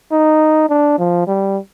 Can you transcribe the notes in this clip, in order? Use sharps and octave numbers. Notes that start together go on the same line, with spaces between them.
D#4
D4
F3
G3